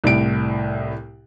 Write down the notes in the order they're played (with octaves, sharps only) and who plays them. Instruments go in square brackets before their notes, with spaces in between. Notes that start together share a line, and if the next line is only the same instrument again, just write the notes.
[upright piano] C2 A2 D7